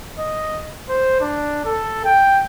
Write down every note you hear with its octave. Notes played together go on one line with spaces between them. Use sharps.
D#5
C5
D4
A4
G5